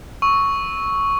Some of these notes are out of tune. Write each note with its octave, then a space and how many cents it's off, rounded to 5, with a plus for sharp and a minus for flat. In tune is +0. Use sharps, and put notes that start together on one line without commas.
C#6 +5 E6 -15